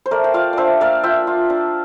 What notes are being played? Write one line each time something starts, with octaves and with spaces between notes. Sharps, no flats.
C5
A3 A#4 D5
G5
F4 D5 F5
D4 C5 D5 E5
A#3 D5 F5
F4 E5 G5
F4
D4